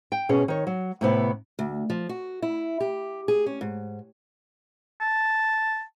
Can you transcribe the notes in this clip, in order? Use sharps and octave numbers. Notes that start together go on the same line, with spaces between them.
G5
B2 C#4 G#4
D#3 C#5
F#3
A2 C3 B3 E4
D2
F3
F#4
E4
G4
G#4
C#4
G#2
A5